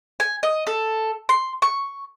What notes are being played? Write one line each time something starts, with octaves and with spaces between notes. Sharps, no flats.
G#5
D#5
A4
C6
C#6